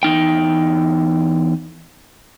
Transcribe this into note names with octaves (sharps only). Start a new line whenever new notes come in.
E2 D#4 G5